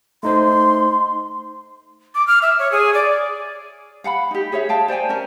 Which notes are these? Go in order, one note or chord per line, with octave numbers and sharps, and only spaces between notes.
A3 D#4 C5 C6
D6
F6
E5
C#5
G#4
D5
F5 F#5 A5 B5
D#4 G4
G#4 C#5 E5
F5 G5 A5
C5 D5 G5 G#5
C#4 A#4